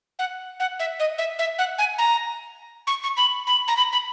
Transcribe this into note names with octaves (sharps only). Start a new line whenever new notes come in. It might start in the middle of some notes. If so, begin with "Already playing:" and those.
F#5
F#5
E5
D#5
E5
E5
F#5
G#5
A#5
C#6
C#6
B5
B5
A#5
B5
B5